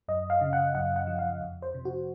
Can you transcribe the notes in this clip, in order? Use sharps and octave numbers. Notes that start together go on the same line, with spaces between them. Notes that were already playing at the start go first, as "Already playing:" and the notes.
F#2 D#5
F5
C#3
F#5
F#2 F#5
F#5
F3
F5
F2
C5
C3
F#4